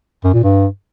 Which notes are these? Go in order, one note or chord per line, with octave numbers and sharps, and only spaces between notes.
F#2
A#2
G2